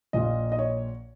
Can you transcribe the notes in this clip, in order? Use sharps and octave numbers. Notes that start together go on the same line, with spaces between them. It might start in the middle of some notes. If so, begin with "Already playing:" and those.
A#1 A#2 A#3 F4 D#5
D#5
C#5